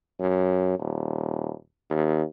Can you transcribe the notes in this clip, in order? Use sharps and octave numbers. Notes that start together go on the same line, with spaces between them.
F#2
D#1
D#2